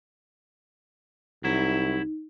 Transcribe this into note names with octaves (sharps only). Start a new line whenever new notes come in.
C2 F#3 D#4 E4